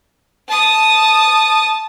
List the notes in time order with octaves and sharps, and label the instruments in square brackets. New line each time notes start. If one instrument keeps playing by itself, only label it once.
[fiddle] A5 D#6